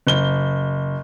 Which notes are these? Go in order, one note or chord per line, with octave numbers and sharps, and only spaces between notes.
F#1 G7